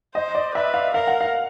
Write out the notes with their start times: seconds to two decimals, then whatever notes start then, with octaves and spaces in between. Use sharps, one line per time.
0.15 C5 D#5
0.35 D5
0.55 B4 E5
0.74 F5
0.94 A#4 F5
1.07 F#5
1.21 F5